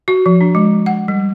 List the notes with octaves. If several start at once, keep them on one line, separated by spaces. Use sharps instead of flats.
F#4
F3
D4
G#3
F#5
G3